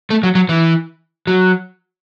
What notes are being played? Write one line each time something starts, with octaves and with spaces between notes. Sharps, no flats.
A3
F#3
F#3
E3
F#3